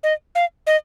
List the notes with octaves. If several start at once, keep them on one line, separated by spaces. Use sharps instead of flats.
D#5
F5
D#5